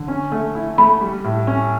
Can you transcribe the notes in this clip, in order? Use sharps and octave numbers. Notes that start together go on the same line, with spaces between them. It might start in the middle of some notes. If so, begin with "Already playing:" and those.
Already playing: D3
C#4
A3
E4
A3 B5
G3
A2
C#4